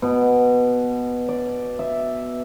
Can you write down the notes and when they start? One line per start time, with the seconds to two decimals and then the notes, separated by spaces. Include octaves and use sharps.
0.02 B2
1.29 D5
1.79 E5